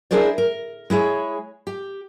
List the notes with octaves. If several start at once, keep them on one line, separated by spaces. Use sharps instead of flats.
D4 E4 G#4 A#4 C5 D5
A#4
G#3 E4 G#4 C#5
G4